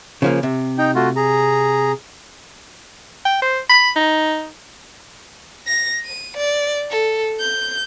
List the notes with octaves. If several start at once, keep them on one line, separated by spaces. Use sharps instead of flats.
C#3 F3 A#3
C3
D#4 G5
A3 F4 F#4
G#4 A#5
G5
C5
B5
D#4
A#6
D#7
D5
A4
G6